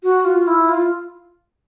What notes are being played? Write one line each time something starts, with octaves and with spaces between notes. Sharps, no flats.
F#4
F4
E4
F4